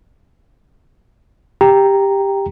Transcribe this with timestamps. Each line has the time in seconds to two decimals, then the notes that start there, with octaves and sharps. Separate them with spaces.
1.61 G4 G5 A#5